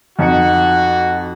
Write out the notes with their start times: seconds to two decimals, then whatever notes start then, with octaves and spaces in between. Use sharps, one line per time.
0.19 F2 D#4 F#4 C#7